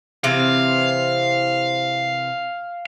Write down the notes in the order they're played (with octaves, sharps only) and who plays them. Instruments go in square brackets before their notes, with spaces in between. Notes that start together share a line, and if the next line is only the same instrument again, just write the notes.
[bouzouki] C3 E3 C4 [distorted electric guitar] F5